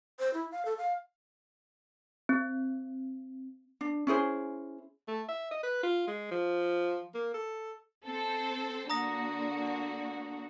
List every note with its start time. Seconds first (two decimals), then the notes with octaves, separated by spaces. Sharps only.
0.19 C5
0.34 E4
0.52 F5
0.65 A4
0.78 F5
2.29 C4
3.81 D4
4.07 C#4 E4 G#4 C5
5.08 A3
5.29 E5
5.51 D#5
5.63 B4
5.83 F4
6.07 G#3
6.31 F3
7.14 A#3
7.34 A4
8.05 C4 A4 C5
8.90 D3 A#3 F#4 A#5 D#6 A#6